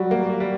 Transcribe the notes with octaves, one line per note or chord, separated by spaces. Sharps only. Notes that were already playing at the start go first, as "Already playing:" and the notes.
Already playing: F#3 G3 F#4
A#3
G3